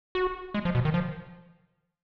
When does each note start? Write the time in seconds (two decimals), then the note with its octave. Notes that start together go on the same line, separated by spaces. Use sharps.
0.15 F#4
0.54 G#3
0.65 F3
0.75 B2
0.85 D#3
0.94 F3